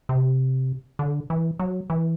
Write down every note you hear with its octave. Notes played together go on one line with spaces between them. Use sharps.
C3
D3
E3
F#3
E3